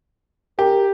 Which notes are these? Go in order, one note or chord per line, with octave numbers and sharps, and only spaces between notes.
G4 A#4